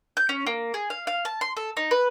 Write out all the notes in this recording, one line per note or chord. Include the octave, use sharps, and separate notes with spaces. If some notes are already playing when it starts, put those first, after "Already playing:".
G6
C#4
A#3
G#4
F5
F5
A5
C6
A4
D#4
B4